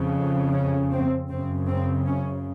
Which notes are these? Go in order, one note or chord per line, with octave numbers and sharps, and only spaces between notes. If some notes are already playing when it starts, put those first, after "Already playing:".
Already playing: F2 C#3
C#4
C4
F#2 C#3 C4
C4
C#4